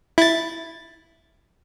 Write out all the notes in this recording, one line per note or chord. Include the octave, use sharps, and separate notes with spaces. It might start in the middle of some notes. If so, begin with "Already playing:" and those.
E4 A6